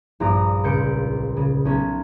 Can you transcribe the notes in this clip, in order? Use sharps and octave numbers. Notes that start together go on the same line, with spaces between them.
A#1 G2 F4 A#5 D6 D#6
C#2 A#2 G6 C#7 D7
C#3
B1 C#4